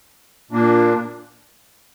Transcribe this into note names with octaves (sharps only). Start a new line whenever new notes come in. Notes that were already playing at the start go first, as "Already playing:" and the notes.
A#2 A#3 D4